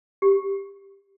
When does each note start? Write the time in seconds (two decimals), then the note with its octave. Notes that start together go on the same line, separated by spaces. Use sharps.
0.22 G4